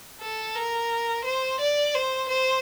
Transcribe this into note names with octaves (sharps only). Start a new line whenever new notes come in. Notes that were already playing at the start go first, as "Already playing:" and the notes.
A4
A#4
C5
D5
C5
C5